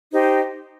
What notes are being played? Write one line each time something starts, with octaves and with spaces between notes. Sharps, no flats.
D#4 G4 C5